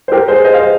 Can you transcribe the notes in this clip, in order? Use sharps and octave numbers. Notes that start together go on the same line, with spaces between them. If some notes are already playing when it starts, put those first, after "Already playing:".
C5
G4 A#4
G#4 C5
C5 D#5
F5
C5 D#5